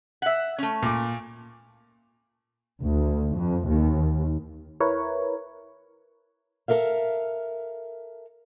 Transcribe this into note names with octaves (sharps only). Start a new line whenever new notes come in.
E5 F#5
A3 C#4
A#2 D6
D2
F2
D#2
E4 A#4 B4 C#5
A4 A#4 E5 F5